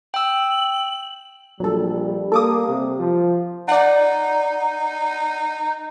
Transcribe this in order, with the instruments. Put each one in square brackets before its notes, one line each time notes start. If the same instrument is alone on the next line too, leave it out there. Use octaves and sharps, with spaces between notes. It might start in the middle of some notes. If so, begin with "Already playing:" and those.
[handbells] G5 E6 [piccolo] F#7
[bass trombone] A#1 [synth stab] F#3 A4 [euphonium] G3
[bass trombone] A#3 [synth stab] A4 D6 D#6
[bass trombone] C3
F3
[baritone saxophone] D#4 [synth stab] D5 F#5